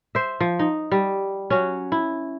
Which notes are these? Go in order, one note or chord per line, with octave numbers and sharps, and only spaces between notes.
C5 E5
F3
D#4
G3
F#3 C#4
E4